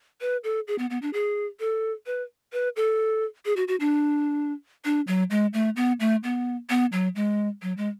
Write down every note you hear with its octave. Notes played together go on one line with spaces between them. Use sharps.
B4
A4
G#4
B3
B3
D4
G#4
A4
B4
B4
A4
G#4
F#4
F#4
D4
D4
F#3
G#3
A3
B3
A3
B3
B3
F#3
G#3
F#3
G#3